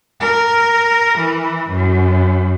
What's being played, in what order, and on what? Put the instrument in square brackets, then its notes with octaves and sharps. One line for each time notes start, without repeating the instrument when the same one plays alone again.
[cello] A#4
E3
F#2